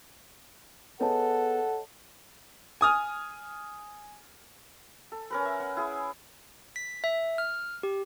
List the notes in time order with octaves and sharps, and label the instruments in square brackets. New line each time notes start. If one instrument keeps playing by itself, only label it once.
[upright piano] B3 G#4 [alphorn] A4 [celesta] C#5 D#5 A5 [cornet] F#5
[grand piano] G#5 D#6 F6
[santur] A4
C#4 A#4 B4
E5
B4 F#5
E4 G#4
[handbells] B6
E5
F6
G4